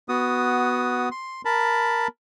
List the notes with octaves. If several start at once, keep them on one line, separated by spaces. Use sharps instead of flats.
B3 F#4 D#6
C6
A#4 A5 B5